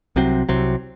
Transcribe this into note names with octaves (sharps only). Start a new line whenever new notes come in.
C2 C3 F#3 C4
C2 C3 F#3 C4